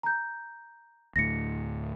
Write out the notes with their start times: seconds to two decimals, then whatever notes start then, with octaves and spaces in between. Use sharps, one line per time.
0.03 A#5 G6
1.16 D2 A2 A#6 C#7